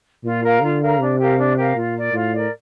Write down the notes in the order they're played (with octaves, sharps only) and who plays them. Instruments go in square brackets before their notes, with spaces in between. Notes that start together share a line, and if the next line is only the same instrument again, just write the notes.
[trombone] A#2 [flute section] F4
[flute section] A#4 F5 A#5
[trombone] D3 [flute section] F4
[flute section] A#4 F5 A#5
[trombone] C3 [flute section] D4
[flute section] G4 A#4 F5
D4
G4 A#4 F5
[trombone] A#2 [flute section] F4
[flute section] A#4 D5
[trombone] A2 [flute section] F4
[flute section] A#4 D5